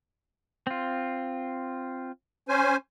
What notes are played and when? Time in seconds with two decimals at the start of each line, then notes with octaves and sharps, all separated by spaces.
0.67 C4 F4
2.49 C#4 C5 G#5